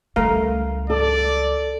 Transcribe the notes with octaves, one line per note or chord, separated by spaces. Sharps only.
C#2 G3 A3 A#4 F5
A4 D5